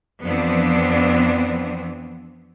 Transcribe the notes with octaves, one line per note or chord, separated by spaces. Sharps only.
F2 E3 F3 B3 C4 D4